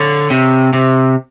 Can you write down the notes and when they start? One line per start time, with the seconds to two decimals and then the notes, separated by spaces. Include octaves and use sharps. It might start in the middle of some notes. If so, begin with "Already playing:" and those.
Already playing: D3 C#5
0.30 C3
0.73 C3